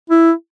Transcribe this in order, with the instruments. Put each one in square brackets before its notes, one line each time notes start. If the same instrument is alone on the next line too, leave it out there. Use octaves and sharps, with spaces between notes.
[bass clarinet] E4